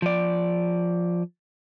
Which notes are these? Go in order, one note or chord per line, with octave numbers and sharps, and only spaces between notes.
F3 D5